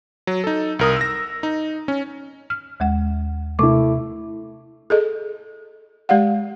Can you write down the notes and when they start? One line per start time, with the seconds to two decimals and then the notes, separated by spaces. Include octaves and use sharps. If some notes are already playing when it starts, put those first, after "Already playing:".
0.27 F#3
0.44 D#4 A4
0.79 C2 A#4 D#6
0.97 E6 A#6
1.43 D#4
1.88 C#4
2.50 F6
2.80 D#2 G#3 F#5
3.59 C3 A3 E4 D6
4.90 G#4 A4 D#5
6.09 G#3 G4 D5 F5 F#5